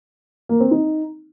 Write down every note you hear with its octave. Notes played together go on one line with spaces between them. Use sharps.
A#3
C4
D#4